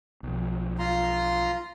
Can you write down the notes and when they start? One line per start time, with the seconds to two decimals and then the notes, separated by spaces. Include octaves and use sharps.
0.23 B1 F3
0.79 F4 A#5 C6